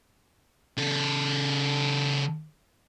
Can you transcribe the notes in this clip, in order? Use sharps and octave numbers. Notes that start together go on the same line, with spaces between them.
C#3 A4